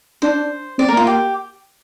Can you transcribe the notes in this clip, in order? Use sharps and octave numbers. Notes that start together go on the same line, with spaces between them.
D4 C5
C4 D5
A#4
A#3 F4
G4